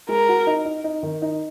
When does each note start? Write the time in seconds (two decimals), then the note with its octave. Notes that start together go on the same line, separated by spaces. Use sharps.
0.09 G#3 A#4
0.29 F#4
0.47 D#4
0.65 D#4
0.84 D#4
1.03 D#3
1.22 D#4